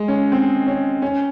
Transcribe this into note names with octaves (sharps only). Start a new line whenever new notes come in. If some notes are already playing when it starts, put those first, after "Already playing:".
Already playing: G#3
C#4
C4
C#4
C#4